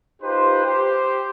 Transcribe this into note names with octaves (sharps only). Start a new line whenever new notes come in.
D#4 F4 G4 B4 C5
G4 C5